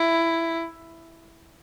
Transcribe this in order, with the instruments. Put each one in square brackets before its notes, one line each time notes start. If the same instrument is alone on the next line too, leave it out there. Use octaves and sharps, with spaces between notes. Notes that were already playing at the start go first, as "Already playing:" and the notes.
Already playing: [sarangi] E4